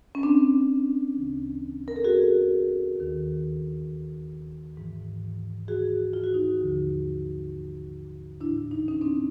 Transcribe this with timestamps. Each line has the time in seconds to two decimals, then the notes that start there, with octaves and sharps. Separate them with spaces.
0.15 C#4
0.23 C4 D4
1.14 D2 C#3 E3
1.88 A#4
1.96 A4
2.04 F#4 G#4
2.96 D#2 D#3
4.77 G#2 E3
5.68 F#4 G#4
6.13 F4
6.24 F#4
6.34 D#4 F4
6.59 D#2 D3 F3
8.41 A2 E3 D4 E4
8.71 D#4
8.80 E4
8.88 C#4 D#4
9.01 C4 D4